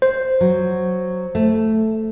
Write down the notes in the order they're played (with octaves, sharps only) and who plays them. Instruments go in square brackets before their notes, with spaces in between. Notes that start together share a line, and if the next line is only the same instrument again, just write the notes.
[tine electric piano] C5
[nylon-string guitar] F#3
A3